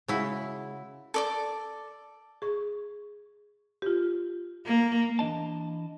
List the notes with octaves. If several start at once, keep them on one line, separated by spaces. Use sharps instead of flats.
C#3 G#3 E4 F#4 E5
A4 D5 D6
G#4 C#6
F4 G4
A#3
E3 D4 D#5 A5